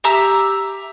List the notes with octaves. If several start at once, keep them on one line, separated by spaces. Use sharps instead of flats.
G4 E5 A#5 E6